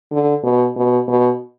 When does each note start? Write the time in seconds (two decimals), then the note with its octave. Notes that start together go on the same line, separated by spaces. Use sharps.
0.12 D3
0.44 B2
0.76 B2
1.08 B2